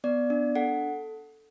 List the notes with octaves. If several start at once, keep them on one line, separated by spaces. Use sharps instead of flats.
B3 D5
D4
A4 F#5